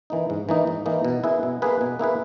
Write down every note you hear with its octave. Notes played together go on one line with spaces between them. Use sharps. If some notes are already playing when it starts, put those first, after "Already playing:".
E3 A#3 D#4
G#2
E3 A#3 D#4
G#2
E3 A#3 D#4
B2
A#3 E4 G#4 B4
B2
A#3 E4 G#4 B4
B2
A#3 E4 G#4 B4